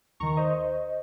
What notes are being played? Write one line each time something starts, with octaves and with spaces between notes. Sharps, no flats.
D#2 D#3 A#5 C#6
C5 D#5